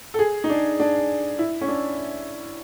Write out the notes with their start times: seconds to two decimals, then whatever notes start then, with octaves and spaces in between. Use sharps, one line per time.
0.14 A4
0.19 G#4
0.44 D#4
0.50 D4
0.80 D4
1.39 E4
1.61 C#4
1.68 D4